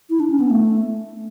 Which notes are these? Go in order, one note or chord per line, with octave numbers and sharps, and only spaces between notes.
E4
D4
C#4
B3
A3